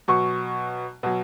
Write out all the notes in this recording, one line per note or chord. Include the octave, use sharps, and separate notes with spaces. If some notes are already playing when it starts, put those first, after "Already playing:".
B2 F#3 C#6
B2 F#3